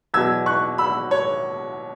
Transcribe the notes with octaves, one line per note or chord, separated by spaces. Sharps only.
E2 B2 F#3 E6 G#6
C#6 F#6
B5 E6
C#5